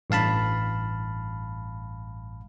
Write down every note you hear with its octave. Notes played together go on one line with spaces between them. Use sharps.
A1 G2 F5 A5 B5